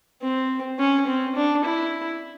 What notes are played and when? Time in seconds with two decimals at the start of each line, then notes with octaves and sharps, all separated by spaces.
0.21 C4
0.79 C#4
1.07 C4
1.36 D4
1.64 E4